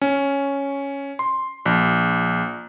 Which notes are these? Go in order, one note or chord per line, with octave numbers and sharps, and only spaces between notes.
C#4
C6
A#1